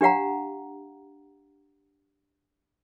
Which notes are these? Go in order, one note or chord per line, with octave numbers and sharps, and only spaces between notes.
D4 G4 F5 F#5 A#5